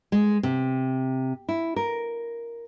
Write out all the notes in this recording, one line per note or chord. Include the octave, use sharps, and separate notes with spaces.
G#3
C3
E4
A#4